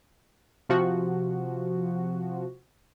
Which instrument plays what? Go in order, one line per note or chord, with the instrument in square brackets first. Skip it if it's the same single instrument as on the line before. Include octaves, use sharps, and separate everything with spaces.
[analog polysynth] C3 F3 F#4